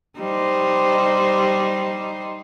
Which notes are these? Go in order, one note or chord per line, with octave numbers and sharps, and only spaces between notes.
G3 D#4 C5